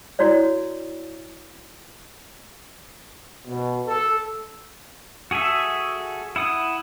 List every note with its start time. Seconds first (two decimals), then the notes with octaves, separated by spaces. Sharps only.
0.19 E4 F#4 C#5 D5
3.47 B2
3.87 A4
5.31 F#4 G#4 A4 E5
6.36 E4 F#5 D#6